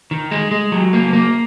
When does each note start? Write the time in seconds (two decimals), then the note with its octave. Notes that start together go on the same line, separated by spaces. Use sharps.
0.11 D#3
0.31 G#3
0.51 G#3
0.72 F#3
0.93 A#3
1.13 A#3